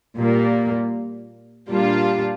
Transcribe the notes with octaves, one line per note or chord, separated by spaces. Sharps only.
A#2 G3 A#3
A#2 G3 D4 F4